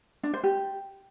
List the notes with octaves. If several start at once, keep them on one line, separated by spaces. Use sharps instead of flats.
D4
C5
G4